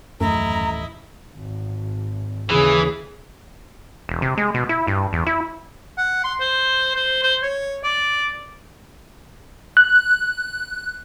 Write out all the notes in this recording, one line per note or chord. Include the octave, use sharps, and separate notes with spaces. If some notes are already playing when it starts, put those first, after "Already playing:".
D#1 A1 F#2 A3 E4 D#5 A#5
G#1
D#2 C#3 E3 G#4
E1
C3
G#3
B2
E4
G2
E2
E4
F#5
C6
C5
C5
C5
C#5
D5
F#6